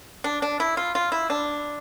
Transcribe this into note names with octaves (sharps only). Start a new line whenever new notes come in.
D4
D4
E4
F4
F4
E4
D4